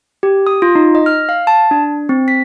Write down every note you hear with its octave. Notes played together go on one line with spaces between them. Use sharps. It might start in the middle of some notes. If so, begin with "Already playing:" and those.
G4
D#6
F4
D#4
D#5
F6
F5
A5
D4
C4
B6